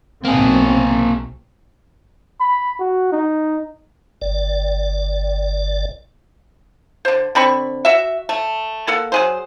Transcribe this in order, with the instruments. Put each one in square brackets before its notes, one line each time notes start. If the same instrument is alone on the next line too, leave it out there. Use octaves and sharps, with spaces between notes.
[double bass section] B1 C4 [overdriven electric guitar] A#3 G#4
[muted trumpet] B5
F#4
D#4
[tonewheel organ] G1 D5
[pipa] D3 C5
D3 C4 B5 C#6
F#4 E5
A3
A#3 A4 F#5
F#3 G#4 C5